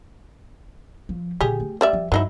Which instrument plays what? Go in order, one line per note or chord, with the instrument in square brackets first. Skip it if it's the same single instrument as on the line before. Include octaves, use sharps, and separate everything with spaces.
[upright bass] F3
[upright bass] A#2 D3 [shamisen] G4 G#4
[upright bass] A3
[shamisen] G3 D5 E5
[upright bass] F3
[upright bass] G2 [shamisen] F#3 D#4 E4